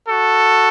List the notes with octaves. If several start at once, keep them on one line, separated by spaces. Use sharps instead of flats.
F#4 A4